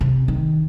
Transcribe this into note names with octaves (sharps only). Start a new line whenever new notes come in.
C3
D#3